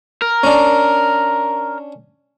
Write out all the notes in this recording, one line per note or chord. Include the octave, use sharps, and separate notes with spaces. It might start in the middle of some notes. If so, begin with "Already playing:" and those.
A#4
C#4 D4